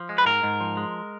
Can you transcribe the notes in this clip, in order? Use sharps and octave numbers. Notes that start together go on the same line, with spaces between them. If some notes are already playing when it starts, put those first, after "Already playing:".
Already playing: F3
G#3
B4
G#2 A#4
G#2
F3
G#3